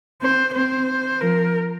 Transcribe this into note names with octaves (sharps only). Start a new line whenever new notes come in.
C4 C5
C4 C5
F3 A#4